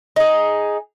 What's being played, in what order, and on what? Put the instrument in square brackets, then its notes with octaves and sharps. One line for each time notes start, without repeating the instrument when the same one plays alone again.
[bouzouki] D#4 G#4